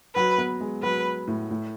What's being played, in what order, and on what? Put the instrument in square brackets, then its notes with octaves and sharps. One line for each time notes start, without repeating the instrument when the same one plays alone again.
[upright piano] F#3 [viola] B4
[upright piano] B3
G#3
[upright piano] F#3 [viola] B4
[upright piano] A2
A2